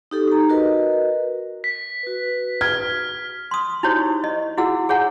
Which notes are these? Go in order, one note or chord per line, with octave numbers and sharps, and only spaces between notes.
D#4 G4 A4
D#4 A#5
F#4 A#4 B4 D#5
B6
F#4 B4
F6 G#6
C6 D#6
D#4 E4 F#4 G4 C5 C#5
D#5
E4 F#4 G#4 F#5 E6
G#4 C#5 F#5 G#5 A#5